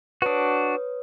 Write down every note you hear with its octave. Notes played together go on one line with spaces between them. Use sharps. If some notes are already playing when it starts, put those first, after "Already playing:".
D4 F#4 B4 C#5 D#6